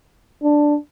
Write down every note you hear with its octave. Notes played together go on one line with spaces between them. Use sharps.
D4